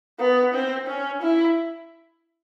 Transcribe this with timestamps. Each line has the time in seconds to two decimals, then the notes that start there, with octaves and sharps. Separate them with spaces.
0.19 B3
0.54 C4
0.87 C#4
1.22 E4